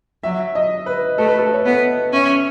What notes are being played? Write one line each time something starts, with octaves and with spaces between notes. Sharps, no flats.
F#3 E5
D#5
B4
A3 A4
B4
A4
C#5
B3 B4
C#4 E5